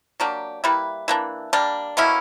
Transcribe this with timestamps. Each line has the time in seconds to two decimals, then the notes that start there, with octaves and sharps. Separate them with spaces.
0.20 F#3 A#3 D4 G4
0.64 G3 A#3 E4 B4
1.08 E3 A#3 D4
1.53 G3 A#3 D4
1.97 B2 A#3 C#4 E4